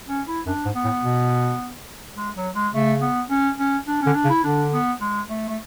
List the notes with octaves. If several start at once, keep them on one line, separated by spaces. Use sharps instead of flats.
C#4
E4
F#2 D4
G#2
B3
A2
B2
G#3
F#3
G#3
C#3 A3
B3
C#4
C#4
D4
D3 C#4
D4
C#3
E4
D3 D4
B3
G#3
A3
A3